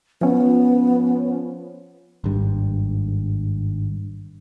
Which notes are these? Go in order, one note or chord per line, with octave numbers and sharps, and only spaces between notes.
F3 B3 C#4
G#1 G2